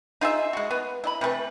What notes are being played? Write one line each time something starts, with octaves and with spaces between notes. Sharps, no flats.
D#4 F4 G#4 E5
G#3 F#4
B3
E4 D#5 B5
C3 E3 A3 B4